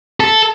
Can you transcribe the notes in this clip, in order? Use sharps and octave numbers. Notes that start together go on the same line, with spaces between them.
A4